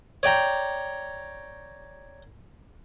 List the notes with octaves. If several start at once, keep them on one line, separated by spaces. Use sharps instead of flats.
C#5 D5 G5 A#5